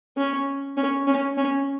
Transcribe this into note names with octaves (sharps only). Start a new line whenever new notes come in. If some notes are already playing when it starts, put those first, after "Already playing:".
C#4
C#4
C#4
C#4